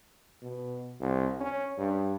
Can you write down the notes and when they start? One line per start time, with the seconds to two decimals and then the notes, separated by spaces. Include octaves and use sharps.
0.42 B2
1.00 C2
1.41 C#4
1.78 G2